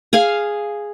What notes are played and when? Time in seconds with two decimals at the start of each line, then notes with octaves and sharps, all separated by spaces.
0.13 G#4 F5 G#5